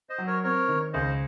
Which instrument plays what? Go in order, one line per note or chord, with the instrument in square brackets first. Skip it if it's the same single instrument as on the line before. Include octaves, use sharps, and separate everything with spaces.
[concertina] C5 D#5
[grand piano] F#3
[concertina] A#4 C#5
[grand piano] C4 [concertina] A#4 C#5
[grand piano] D#3
[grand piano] C#2 [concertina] C5 D#5